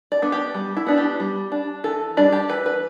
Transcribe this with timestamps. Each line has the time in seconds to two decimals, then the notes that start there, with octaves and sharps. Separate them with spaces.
0.12 D5
0.22 B3 D4
0.32 G4
0.54 G3
0.77 E4
0.87 B3 D4
0.97 G4
1.20 G3
1.52 D4
1.84 E3 A4
2.17 G3 D4 D5
2.32 G4
2.49 E3 B4
2.66 B4